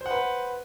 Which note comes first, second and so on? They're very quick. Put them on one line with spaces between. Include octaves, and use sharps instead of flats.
C5 F#5 B4